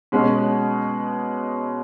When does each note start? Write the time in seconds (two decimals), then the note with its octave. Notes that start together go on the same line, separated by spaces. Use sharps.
0.12 B2 G#3 C#4